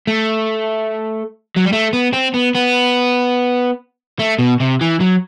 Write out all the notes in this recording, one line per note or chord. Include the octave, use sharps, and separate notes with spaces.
A3
F#3
G3
A3
B3
C4
B3
B3
A3
B2
C3
E3
F#3